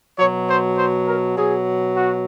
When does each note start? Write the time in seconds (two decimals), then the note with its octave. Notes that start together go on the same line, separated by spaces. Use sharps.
0.19 B2 F#3 C#5
0.49 C5
0.78 C5
1.08 A#4
1.37 B2 F#3 G#4
1.97 F#4